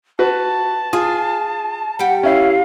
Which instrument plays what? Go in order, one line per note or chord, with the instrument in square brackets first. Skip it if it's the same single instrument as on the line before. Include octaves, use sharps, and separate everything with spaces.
[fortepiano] F#4 B4 [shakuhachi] A5
[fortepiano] F4 [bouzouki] G#4 G#5
[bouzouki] G3 G4 [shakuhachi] F#5
[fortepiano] C#4 E4 [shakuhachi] F5